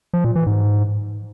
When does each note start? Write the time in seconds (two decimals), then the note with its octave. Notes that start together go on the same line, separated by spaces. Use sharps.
0.13 F3
0.24 A#2
0.35 E3
0.46 G#2